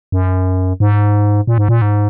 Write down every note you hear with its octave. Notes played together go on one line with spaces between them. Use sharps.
F#2
G#2
A#2
G#2
A#2
G#2